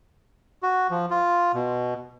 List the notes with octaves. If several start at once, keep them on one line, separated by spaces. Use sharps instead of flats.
F#4
F3
F4
B2